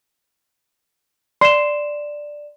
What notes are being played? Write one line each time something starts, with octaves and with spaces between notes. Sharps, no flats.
D5 C6 E7